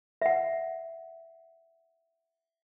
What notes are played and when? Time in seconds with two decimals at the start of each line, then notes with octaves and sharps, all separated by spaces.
0.22 E5 F#5